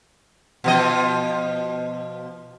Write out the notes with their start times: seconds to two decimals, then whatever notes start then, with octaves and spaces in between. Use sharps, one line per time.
0.64 B2 F3 D#5